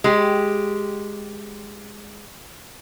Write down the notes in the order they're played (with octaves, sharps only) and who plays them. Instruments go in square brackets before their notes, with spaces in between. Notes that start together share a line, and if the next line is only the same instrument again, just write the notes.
[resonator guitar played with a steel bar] G#3 G4